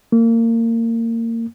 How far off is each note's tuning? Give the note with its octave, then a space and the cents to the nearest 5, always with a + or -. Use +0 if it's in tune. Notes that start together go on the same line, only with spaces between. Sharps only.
A#3 -25